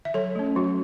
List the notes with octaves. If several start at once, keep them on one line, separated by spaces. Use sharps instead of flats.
E5
F#3 A4 C#5
A3 C#4
F#3 F#4